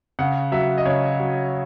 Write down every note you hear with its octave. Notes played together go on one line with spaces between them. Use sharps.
C#3 F#5
F#3 E5
D#5
C#3 C#5
F#3